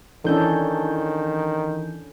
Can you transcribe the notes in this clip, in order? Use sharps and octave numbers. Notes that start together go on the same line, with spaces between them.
D#3 E3 C#4 D4 A4 G6